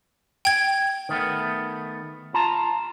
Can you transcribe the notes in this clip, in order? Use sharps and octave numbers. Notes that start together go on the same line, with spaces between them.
G5 G#6
D#3 A3 B3
F4 A5 A#5